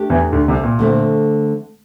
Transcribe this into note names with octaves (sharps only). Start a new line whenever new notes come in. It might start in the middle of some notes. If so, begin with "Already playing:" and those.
Already playing: A3 D4 G4
E2 E3
D2 D3
C2 C3
A#2
D3 A3 C4